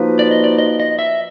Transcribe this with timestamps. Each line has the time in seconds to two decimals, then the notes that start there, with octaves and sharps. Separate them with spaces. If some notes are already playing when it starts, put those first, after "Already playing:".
Already playing: F3 A#3 D#4 F#4 B4
0.19 D5
0.31 D#5
0.44 D5
0.58 D#5
0.80 D#5
0.99 E5